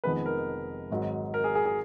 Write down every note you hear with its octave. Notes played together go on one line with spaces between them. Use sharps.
F1 F2 D#3 G#3 B3 B4
A#4
G#1 G#2 F#3
A#4
G#4
G#4
G#4